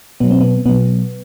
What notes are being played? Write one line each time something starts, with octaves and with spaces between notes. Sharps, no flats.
B2 F#3 B3
C4
B3
B2 F#3 B3